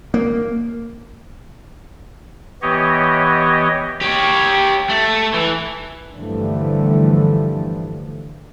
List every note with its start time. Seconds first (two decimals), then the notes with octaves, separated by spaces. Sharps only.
0.14 A#3
2.62 E3 B3 G4 C#5 D#5
4.01 G4 C#5
4.89 A3
5.34 E3
6.15 G2 D3 E3 F3 G3 A3